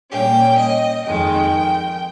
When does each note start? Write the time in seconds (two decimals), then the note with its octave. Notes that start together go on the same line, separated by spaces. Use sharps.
0.11 A#2 G3 A#3 C#4 G5
0.58 D#5
1.06 F2 D#3 G#3 G5